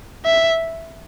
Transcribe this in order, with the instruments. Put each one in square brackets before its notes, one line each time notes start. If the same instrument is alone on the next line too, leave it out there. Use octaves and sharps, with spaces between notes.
[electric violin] E5